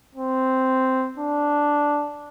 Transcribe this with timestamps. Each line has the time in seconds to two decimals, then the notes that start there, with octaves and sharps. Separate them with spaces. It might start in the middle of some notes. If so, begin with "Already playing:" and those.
0.15 C4
1.18 D4